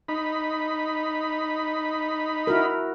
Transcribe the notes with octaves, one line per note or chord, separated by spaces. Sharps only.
D#4 B5
E4 F#4 A#4